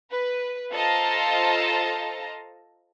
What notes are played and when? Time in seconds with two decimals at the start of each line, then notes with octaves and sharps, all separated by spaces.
0.11 B4
0.72 F4 A4 C5 D#5 A5 A#5